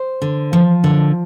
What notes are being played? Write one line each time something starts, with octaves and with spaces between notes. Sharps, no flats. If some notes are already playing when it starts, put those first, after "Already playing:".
Already playing: C5
D3
F3
D3